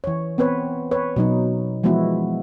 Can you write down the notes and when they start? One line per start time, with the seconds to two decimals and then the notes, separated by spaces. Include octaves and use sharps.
0.04 E3 C#5
0.38 B3 C4 B4 C#5
0.91 B4 C#5
1.16 B2 F#3 D#4
1.83 E3 F3 G#3 B3 E4 F#4